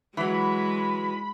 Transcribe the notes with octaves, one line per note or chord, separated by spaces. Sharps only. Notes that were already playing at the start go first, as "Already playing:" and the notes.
E3 F#3 G#3 B5